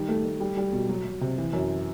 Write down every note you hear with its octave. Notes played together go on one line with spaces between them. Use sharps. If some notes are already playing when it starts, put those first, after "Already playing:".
Already playing: D#3 G3
A3
A3
G3
G3
B2
F#3
F#3
C3
E3
F#2